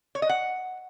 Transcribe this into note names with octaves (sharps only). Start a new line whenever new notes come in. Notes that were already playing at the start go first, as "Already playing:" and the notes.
C#5
D#5
F#5